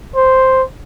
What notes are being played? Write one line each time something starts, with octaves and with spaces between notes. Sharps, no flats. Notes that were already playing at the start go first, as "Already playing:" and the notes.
C5